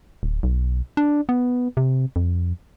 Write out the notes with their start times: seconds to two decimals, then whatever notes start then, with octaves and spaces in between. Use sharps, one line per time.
0.23 D1
0.43 B1
0.97 D4
1.29 B3
1.77 C3
2.16 F2